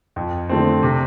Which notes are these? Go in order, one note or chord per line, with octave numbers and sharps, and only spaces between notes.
F2
D3 A3 C4
C3